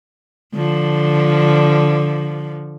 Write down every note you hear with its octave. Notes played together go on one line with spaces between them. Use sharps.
D3 F3